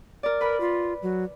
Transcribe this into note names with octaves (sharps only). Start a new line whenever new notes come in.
A#4 D5
A#4 B4 B5
F4
F#3